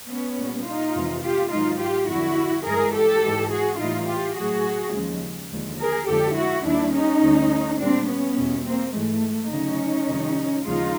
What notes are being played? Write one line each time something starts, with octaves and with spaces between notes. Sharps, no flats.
B3 C#4
A#2 G3
D#4 F4
F2 C3 E3 G#3
F4 G4
G#2 D#3 F#3 D#4 F4
F4 G4
F2 D3 G3 E4 F#4
G2 E3 G#3 G#4 A#4
G4 A4
G#2 E3 G#3
F#4 G#4
A2 E3 G3 D#4 F4
F4 G4
A2 F#3 F#4 G#4
D#2 C#3 F3 G#3
D#2 D3 F3 G#3
G#4 A#4
F2 D3 F3 G#3 G4 A4
E4 F#4
D#2 D#3 G3 D4 E4
C#4 D#4
D2 D3 G3
A#2 G3 C4 D4
B3 C#4
E2 B2 G3
A#3 C4
G#2 E3 G#3 A3
D2 C#3 F#3 C#4 D#4
F2 C3 D#3 G3
D#2 C#3 F3 G#3 D#4 F4